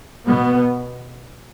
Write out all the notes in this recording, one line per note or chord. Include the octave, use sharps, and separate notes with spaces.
B2 B3